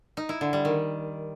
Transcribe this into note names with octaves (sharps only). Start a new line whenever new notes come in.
D#4
E4
D3
G3
D#3